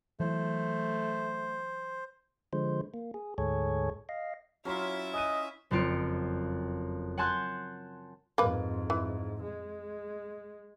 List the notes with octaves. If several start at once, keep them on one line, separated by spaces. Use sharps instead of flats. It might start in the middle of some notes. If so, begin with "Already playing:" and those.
E3 F#3 A3 C5
D3 F3 G#3 C5
A#3
G#4
D2 G#2 G#4 A4 C#5
D#5 F5
F#3 C#4 E4 F4 E5 A#5 C6
D#5 G#5 F#6 D#7
F#1 F2 C4 F4 C#7 D7
F#5 G#5 A5 C6 F#6 G6
F2 G#2 A#3 B4
E3
G#3